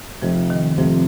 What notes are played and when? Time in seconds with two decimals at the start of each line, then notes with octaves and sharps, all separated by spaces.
0.22 F1 F2 C3 F3
0.50 D#3
0.78 F1 F2 C3 F3